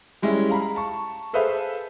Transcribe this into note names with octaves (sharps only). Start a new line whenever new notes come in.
G3 G#3 C#4 E4
F5 A#5 B5
A5 C#6
G#4 A4 B4 C5 E5 F5